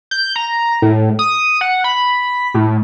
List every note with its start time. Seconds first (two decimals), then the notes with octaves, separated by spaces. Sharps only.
0.11 G6
0.36 A#5
0.82 A2
1.19 D#6
1.61 F#5
1.84 B5
2.54 A2